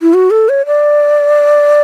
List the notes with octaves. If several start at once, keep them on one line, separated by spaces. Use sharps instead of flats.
E4
F#4
A4
C#5
D5